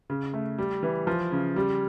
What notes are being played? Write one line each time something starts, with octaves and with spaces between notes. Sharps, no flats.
C#3
A3
G3
E3
F3
C#3
G3